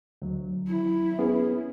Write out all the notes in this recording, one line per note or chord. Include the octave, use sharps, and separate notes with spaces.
D2 F#3
E4
B3 C#4 G#4